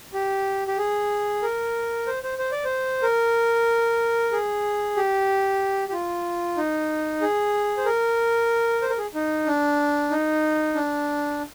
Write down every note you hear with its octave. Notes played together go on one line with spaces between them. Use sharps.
G4
G4
G#4
A#4
C5
C5
C5
D5
C5
A#4
G#4
G4
G4
F4
D#4
G#4
C5
A#4
C5
A#4
G#4
D#4
D4
D#4
D4